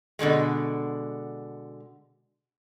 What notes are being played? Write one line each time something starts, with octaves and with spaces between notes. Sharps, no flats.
B2 D3 D#3 G#3